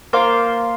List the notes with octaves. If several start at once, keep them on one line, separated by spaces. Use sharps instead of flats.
A#3 F4 C5 F5